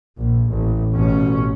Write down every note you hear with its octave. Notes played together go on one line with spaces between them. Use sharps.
A#1
A1
A1 B2 C#4